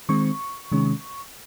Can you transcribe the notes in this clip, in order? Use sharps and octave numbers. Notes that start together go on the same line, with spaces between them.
D#3 G#3 C4 C#6
C3 D#3 G#3 C#4